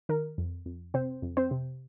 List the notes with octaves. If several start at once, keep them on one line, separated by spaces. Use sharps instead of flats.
D#3 A#4
F2
F2
C3 C4 C5
F2
C4 C5
C3